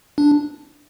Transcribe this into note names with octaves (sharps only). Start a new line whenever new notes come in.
D4